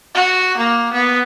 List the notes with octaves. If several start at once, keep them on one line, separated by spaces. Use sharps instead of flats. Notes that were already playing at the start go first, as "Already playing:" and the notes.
F#4
A#3
B3